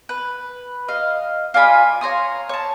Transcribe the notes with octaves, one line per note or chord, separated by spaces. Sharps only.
B4
D#5 F5
F4 D5 G#5 B5
C#5 A#5 C6 D#6
C#5 A5